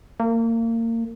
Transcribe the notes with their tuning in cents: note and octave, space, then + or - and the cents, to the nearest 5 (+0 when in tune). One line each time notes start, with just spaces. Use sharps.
A#3 -30